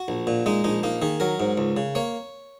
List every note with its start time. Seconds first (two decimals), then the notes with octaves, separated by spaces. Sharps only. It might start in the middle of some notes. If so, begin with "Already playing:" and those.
Already playing: F#4
0.08 A#1
0.27 A#2
0.46 G#3 D#4
0.64 A#1 D#4
0.83 A#3 D#4
1.02 D#3 G#4
1.20 F#3 A#4
1.40 G#2
1.58 C#2
1.77 C#3
1.95 A#3 C#5